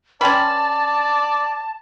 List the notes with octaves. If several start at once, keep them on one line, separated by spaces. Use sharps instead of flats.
C#4 B4 D5 G5 A5 B5 C6